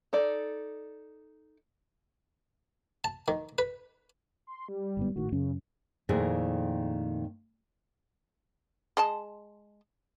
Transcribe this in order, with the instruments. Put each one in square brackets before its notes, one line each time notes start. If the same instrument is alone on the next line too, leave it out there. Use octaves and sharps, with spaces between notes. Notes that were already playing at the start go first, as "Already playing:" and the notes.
[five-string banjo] D#4 A4 D5
[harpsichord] A5
D#3
B4
[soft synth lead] C6
G3
[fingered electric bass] G1 G#2 B3
[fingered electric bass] G#1 A2 D#3 [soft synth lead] F#4
[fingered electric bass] F#2 C#4 [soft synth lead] C#3
[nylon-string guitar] F2 A#2 D#3 A3 E4 G#4
[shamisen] G#3 D#5 A5